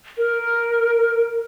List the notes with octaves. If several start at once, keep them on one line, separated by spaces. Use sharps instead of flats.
A#4